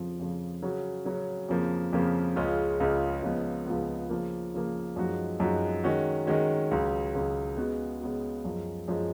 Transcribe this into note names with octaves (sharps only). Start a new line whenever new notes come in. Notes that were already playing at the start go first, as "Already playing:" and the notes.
Already playing: F2 C#3 F3
F2 C#3 F3
C#3 F#3 C#4 F#4
C#3 F#3 C#4 F#4
F2 C#3 F3 A#3
F2 C#3 F3 A#3
C#2 C#3 G#3 C#4 F4
C#2 C#3 G#3 C#4 F4
C#2 C#3 F3 G#3 B3
C#2 C#3 F3 G#3 B3
C#3 F3 A#3
C#3 F3 A#3
F#2 F3 G#3 D#4 F#4
F#2 F3 G#3 D#4 F#4
D#3 G#3 C#4 F#4
D#3 G#3 C#4 F#4
C#2 C#3 F#3
C#2 C#3 F#3
C#3 G#3 B3 F#4
C#3 G#3 B3 F#4
F#2 F3 G#3
F#2 F3 G#3